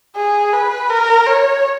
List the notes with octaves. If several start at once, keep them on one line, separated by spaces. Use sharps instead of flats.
G#4
B4
A#4
C#5